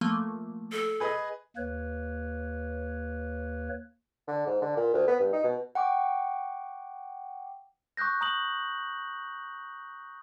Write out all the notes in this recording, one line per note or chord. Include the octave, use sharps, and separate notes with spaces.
F3 A3 A#3
A4
G#4 B4 D#5
D#2 A#3 B4 C#5
D3
G#2
D3
A#2
D2
B3
G2
D#4
B2
F#5 G5 C#6 D6
C#6 D#6 F#6 G6 A#6
A#5 D#6 F#7